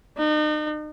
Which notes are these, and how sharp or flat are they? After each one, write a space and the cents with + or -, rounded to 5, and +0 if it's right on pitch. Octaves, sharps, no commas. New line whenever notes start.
D#4 -40